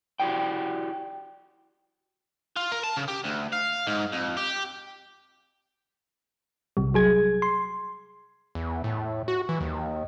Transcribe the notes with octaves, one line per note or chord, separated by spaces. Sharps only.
E4 F#4 G4 D5 G5
F4
A#4
A5
C#3
G4
D2
F5
G#2
F2
G4
B1 C3 G3
F#3 G#4 G#6
C6
E2
A2
F#4
E3
D#2